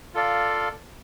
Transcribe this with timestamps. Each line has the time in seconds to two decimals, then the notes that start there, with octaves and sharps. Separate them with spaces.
0.14 F4 A4 D5 F5